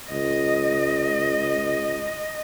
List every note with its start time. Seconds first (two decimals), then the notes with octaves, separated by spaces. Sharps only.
0.11 C#2 D#5